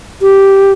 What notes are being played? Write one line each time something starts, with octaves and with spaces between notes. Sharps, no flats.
G4